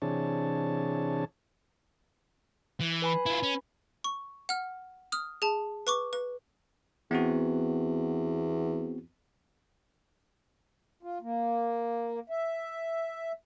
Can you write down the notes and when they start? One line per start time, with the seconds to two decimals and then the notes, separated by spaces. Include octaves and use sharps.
0.02 C3 E3 D4 G#4 C#5 A5
2.80 E3
3.02 B4 G#5 B5
3.26 E4 F4
3.43 C#4
4.04 C#6
4.49 F#5 F6
5.12 D#6 F6
5.42 G#4 A5
5.87 B4 C#6 D6
6.13 B4
7.11 E2 B3 C4 F#4
11.03 F4
11.22 A#3
12.30 E5